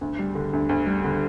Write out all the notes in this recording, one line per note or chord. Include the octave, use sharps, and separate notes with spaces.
D2
G3
D3
D2
D2
G3
D3